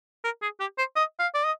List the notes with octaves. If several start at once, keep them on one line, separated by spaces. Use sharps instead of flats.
A#4
G#4
G4
C5
D#5
F5
D5
D#5